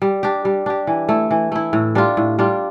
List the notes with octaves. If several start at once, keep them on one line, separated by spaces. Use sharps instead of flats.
G3
D4 G4
G3
D4 G4
E3
A3 E4
E3
A3 E4
A2
G3 D4 F4
A2
G3 D4 F4